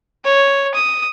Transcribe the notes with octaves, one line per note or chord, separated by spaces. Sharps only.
C#5
D#6